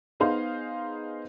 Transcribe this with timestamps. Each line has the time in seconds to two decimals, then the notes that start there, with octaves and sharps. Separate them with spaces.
0.20 B3 D#4 G#4 C5 F5